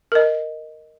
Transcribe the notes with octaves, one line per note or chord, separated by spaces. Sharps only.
A#4 D#5